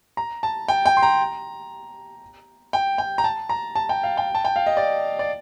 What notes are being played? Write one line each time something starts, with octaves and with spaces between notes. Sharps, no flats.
A#5
A5
G5
G5
C6
A#5
G5
G5
A#5
A5
A#5
A5
G5
F5
G5
A5
G5
F5
D#5
D5
D5